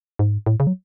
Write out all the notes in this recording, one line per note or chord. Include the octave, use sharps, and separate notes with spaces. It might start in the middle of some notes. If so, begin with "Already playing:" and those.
G#2
A2
C#3
F#3